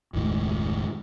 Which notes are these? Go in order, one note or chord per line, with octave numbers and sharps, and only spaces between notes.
F#1 D#2 A2 G#3